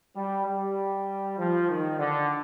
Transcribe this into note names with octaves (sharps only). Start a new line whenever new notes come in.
G3
G3
F3
D#3
D3